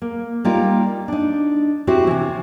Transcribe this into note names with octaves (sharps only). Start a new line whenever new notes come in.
A#3
G3 A#3 D#4 F4 G4 A#4
D4 D#4
C4 E4 F#4 G4 C5
C3 E3